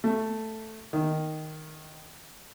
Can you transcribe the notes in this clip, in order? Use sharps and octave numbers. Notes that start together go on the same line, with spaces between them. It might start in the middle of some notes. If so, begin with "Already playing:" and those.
A3
D#3